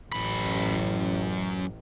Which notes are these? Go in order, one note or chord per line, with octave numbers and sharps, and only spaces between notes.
A1 F#2 B5